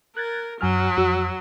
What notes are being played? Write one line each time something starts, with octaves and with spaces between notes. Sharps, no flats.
A#4 F#6 G#6 A6
F#2 F#3 G#5 F6
F2 F#4 E6